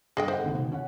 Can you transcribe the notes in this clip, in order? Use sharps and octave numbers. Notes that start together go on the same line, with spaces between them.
G2 G#4 D#5 G5
A4 C5 D#5 F#5
G#1 D#2 C3
B2
C#4 C#5 F#5